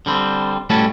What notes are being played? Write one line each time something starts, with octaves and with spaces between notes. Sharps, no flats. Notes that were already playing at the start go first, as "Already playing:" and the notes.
D3 G3 C4
A2 G3 A3 C#4 F#4 A5